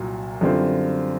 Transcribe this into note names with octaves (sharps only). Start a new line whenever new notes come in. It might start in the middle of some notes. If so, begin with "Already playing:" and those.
Already playing: C2 A#2 F#3
F#2 D3 G3 C4 F4